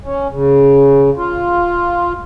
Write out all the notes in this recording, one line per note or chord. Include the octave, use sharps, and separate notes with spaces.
C#4
C#3
F4